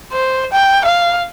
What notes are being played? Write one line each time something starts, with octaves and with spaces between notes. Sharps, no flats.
C5
G5
F5